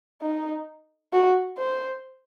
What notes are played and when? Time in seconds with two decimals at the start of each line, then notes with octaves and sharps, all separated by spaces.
0.22 D#4
1.13 F#4
1.58 C5